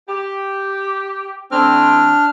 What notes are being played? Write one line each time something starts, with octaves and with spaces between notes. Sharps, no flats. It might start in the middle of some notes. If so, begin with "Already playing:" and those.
G4
E3 A3 C4 D4 F6